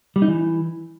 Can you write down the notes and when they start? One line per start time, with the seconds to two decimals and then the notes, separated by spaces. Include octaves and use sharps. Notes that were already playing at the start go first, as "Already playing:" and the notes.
0.16 G3
0.22 D#4
0.28 E3